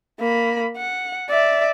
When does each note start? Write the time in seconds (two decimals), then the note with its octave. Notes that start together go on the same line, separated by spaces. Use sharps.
0.20 A#3 B5
0.77 F#5
1.30 D5 E5